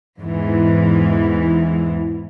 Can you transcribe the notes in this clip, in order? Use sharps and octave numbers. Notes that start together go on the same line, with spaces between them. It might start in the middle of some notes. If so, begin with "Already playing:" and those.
E2 G#2 E3